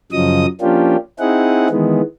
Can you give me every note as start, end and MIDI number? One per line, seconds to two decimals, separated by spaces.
0.12 0.46 42
0.12 0.46 49
0.12 0.46 53
0.12 0.46 54
0.12 0.46 75
0.12 0.46 87
0.61 0.96 53
0.61 0.96 58
0.61 0.96 61
0.61 0.96 62
0.61 0.96 65
0.61 0.96 67
1.19 1.68 60
1.19 1.68 63
1.19 1.68 64
1.19 1.68 68
1.19 1.68 78
1.70 2.01 51
1.70 2.01 52
1.70 2.01 56
1.70 2.01 59